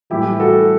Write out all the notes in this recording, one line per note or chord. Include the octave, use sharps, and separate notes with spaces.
A2 E3 G3 E4 G4
F#4 A4